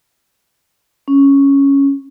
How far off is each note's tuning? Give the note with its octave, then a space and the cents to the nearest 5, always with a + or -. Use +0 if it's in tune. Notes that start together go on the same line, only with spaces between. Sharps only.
C#4 +0